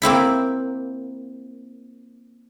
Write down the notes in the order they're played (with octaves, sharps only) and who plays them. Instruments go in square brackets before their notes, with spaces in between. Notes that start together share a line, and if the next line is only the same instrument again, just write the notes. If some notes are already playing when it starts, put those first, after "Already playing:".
[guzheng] A#3 C4 E4 B5